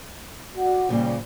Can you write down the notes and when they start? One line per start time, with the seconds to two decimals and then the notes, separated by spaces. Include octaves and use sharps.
0.56 F#4 D5
0.89 A#2 C#3 F3 G3